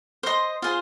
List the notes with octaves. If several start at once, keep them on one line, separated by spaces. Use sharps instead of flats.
C5 D#5 C6
F4 G#4 C5